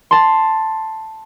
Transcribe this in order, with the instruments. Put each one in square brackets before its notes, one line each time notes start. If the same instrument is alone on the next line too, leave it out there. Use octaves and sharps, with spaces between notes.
[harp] A5 C6